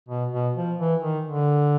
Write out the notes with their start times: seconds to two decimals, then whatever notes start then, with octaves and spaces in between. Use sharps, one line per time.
0.09 B2
0.32 B2
0.55 F3
0.79 E3
1.02 D#3
1.25 D3